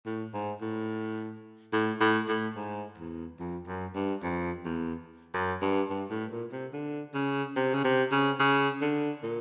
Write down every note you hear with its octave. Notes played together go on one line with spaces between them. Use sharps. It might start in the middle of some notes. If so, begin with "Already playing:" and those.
A2
G#2
A2
A2
A2
A2
G#2
E2
F2
F#2
G2
F2
E2
F#2
G2
G2
A2
A#2
C3
D3
C#3
C3
C#3
C3
C#3
C#3
D3
A#2